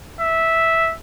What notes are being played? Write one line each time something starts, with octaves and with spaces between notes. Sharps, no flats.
E5